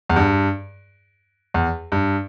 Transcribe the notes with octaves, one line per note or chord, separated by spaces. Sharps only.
E2
G2
E2
G2